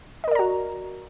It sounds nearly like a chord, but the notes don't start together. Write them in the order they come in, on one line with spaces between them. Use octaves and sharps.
D#5 A#4 D5 A#5 F#4